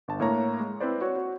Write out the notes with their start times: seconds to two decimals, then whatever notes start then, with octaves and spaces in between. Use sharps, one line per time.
0.08 G1 A5
0.20 A2 A#3 C#5 A#5
0.60 G#3
0.80 C4 E4 B4 C5 D5
1.01 F#4 C#5
1.16 F#4